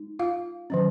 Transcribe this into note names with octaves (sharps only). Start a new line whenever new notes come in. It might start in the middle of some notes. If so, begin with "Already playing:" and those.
Already playing: G#3 D#4
F4 F5
D#3 F#3 C#4